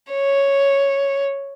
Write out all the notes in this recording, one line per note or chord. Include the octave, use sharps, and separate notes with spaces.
C#5